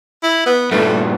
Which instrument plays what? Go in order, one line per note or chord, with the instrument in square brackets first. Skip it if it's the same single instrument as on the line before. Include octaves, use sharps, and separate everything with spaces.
[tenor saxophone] E4
B3
[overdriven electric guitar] G2 A#2 [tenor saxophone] A3